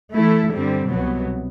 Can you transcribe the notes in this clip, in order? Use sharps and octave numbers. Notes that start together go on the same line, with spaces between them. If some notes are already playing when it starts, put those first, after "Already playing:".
E3 A3 E4 A4
G2 D3 G3 C4
C2 B2 F#3 B3